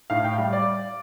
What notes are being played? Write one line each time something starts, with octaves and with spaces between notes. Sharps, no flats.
A2 F5
G5
G3 F5
D5